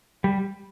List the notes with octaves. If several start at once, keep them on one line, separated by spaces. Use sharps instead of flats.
G3